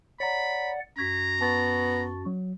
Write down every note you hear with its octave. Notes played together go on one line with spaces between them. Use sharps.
C#5 D5 F#5 A#5 B5
F#2 F#4 A#5 G#6 B6
B3 A5 C#6 A6
F#3